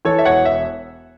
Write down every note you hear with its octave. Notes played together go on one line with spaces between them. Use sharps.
E3 A4 C#5
E5
E1 C#5 F#5
E5